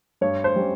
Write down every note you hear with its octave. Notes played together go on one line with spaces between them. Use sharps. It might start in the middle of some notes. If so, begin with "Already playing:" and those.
G2 C#5
C5
G3 C#4